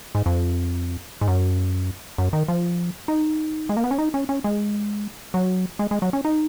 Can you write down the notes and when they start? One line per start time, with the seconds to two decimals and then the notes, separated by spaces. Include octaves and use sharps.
0.15 G#2
0.26 F2
1.21 G#2
1.28 F#2
2.18 F#2
2.33 D#3
2.48 F3
3.08 D#4
3.69 G#3
3.77 A#3
3.84 B3
3.91 C#4
3.98 D#4
4.14 C#4
4.29 C#4
4.44 G#3
5.34 F#3
5.79 G#3
5.91 G#3
6.02 F#3
6.13 C#4
6.25 D#4